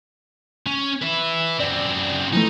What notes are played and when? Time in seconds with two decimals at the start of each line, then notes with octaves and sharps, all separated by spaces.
0.67 C#4
1.02 B4 E5
1.60 F#2 C4 D5
2.33 E3 F3 A3 D#4